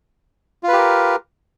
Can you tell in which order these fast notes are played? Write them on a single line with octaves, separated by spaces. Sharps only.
F4 B4 G4 A#4